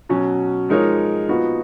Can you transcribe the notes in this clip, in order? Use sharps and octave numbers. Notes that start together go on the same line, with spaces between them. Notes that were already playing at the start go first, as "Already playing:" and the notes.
B2 F#3 C#4
F3 G#3 D#4 A#4 C#5
A#2 F3 B3 D#4 F#4